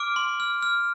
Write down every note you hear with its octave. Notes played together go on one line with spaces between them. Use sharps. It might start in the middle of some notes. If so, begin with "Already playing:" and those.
Already playing: D6 F6 D7
C6
F6
F6